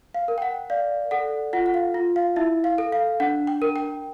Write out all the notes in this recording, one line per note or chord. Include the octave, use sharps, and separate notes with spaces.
F5
A#4
G5
F#5
D5 F5
A4 F#5
F4 F#5
F#5
F5
F4
F5
E4 E5
F5
A4
F5
D4 F#5
G5
A#4
G5